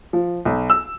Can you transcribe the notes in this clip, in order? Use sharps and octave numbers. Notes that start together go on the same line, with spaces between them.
F3
B1
E6